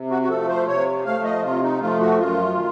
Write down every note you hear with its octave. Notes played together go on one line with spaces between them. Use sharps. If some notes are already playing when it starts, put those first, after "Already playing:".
Already playing: C3
F#4
F#4
F3 A3 A4
C5
C3 C#5
F3 A3 F5
D#5
C3 F4
D#4
F3 A3 F4
F#4
F#2 F4
D#3